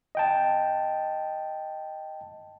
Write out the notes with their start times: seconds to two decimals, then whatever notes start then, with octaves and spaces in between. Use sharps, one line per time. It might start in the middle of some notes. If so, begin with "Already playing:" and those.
0.15 D#5 G5 A5